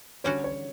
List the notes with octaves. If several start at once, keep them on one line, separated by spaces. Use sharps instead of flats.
D3 G3 C#4 F#4 C#5
C#5